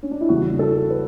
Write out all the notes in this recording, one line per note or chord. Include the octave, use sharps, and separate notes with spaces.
C#4
D4
E4
E2 C#3 E3 G3 F#4
A4
B4